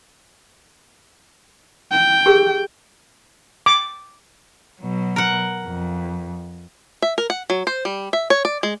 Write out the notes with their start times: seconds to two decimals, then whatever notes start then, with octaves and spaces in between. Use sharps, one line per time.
1.91 G5
2.26 G4 G#4 A#4
3.66 D6
4.81 B2 F#3
5.16 A#4 F#5
5.66 F2
7.02 E5
7.18 A#4
7.30 F#5
7.50 F#3
7.67 C5
7.85 G3
8.13 E5
8.30 C#5
8.45 D5
8.63 G#3